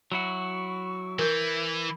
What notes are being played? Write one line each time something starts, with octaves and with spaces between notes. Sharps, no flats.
F#3 E4 F#4 C#6
E3 A#4 G6